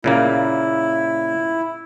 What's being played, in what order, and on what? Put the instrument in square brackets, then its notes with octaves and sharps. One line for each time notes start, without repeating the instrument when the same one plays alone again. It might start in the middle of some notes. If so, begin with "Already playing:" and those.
[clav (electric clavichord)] A#2 C#3 A#3 [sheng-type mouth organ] E4